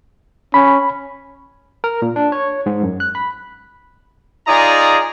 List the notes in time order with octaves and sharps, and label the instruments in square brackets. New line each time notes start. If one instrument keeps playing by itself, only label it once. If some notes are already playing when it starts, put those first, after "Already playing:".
[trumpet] C#4 [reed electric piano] B5
[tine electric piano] A#4
A#2
D4
C#5
G#2
F#2
F#6
B5
[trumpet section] D#4 F4 G#4 D5 A#5 D#6